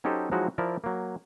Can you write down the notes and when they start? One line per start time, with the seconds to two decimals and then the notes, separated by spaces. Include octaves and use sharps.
0.04 F#3 C#4 D#4 G4 A4 C5
0.32 F3 F#3 G#3 D#4 E4 F#4
0.58 F3 E4 A#4 D5
0.84 F#3 A#3